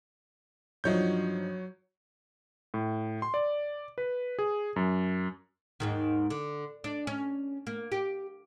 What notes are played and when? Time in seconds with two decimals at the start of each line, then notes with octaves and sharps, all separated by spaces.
0.84 G2 F3 F#3 D#4 C#5 G6
2.74 A2
3.22 C6
3.34 D5
3.98 B4
4.39 G#4
4.76 F#2
5.80 D#2 G#2 D#3
6.30 D3
6.84 D4
7.07 C#4
7.67 A#3
7.92 G4